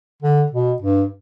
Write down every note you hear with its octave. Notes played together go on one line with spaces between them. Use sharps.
D3
B2
G2